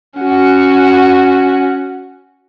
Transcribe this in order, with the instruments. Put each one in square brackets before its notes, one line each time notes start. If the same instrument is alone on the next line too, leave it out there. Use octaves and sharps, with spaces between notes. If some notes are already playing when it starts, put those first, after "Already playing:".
[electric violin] C#4 F#4